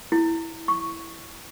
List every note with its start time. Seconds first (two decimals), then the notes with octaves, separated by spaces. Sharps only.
0.12 E4
0.68 C#6